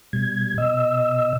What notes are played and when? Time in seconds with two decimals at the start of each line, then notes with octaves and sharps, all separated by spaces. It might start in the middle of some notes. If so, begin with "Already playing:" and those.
0.13 B2 G3 G#6
0.58 B2 D#5 E6